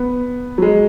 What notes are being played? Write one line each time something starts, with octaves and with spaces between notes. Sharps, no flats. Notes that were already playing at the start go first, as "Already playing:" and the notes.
Already playing: B3
F#3
G#3